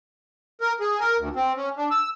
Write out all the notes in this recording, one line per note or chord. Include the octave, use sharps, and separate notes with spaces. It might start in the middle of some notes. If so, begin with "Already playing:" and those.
A#4
G#4
A#4
D2
C4
C#4
D4
E6